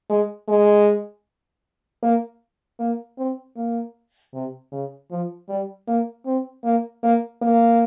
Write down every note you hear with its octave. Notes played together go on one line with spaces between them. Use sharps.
G#3
G#3
A#3
A#3
C4
A#3
C3
C#3
F3
G3
A#3
C4
A#3
A#3
A#3